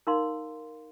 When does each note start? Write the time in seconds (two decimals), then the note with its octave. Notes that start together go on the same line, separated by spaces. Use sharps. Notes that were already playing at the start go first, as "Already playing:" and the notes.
0.07 D#4 A#4 F5 C6